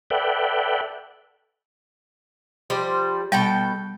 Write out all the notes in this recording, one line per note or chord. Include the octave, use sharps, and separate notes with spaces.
A4 B4 D5 E5 F#5 G5
F3 G3 C5
B2 G3 A4 G5